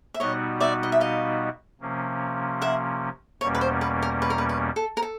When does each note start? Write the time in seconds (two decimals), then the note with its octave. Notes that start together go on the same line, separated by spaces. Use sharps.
0.14 E5
0.20 B2 G3 B3 D#4 F#4 C#5 D#5
0.60 D5 E5
0.83 D#5
0.92 E5
1.00 D#5 F5
1.80 C3 F3 A#3 C#4
2.61 E5 F#5
3.41 E2 B2 G3 A#3 C#4 C#5
3.55 B4
3.61 C5
3.81 B4
4.02 A#4
4.22 B4
4.30 A#4
4.38 B4
4.49 B4
4.76 A4
4.97 A#4
5.02 A4